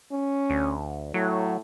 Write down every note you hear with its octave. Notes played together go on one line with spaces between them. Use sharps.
C#4
D2
A2 F#3